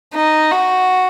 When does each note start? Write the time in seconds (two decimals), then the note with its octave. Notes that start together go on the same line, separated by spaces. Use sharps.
0.14 D#4
0.51 F#4